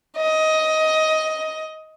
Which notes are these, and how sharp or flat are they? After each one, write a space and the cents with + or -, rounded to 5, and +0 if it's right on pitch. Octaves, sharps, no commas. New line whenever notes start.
D#5 +15